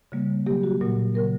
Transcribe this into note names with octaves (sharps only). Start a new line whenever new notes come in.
C#3 G3 A#3
B2 F#3 A#3 G4
F#4
A#2 F#3 A#3
C#3 F#3 A#3 A#4